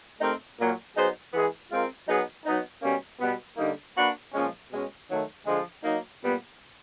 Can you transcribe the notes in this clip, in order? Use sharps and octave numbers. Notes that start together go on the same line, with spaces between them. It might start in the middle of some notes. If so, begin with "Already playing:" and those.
A3 C4 D#4 G4 A#4
A#2 F#3 A#3
F#3 B3 D#4 G#4 C5
E3 G#3 B3 E4 G#4
G#3 C4 F4 A#4
F#3 B3 D#4 G#4
F#3 B3 D#4
B2 G3 A#3 C#4
B2 G3 B3
D3 G3 A#3 D#4
A#3 D4 F#4 B4
A#2 F3 G#3 C#4
B2 G#3 C#4
D#3 F#3 A3
D3 F3 G#3
F#3 A#3 D#4
A#2 G3 B3